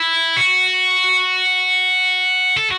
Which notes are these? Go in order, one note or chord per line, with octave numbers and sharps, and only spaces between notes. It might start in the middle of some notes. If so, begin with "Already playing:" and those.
Already playing: E4
F#4
A4